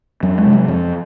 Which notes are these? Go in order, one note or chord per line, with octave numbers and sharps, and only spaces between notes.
F2 F#3
G#3
C3
F#3
F2 F3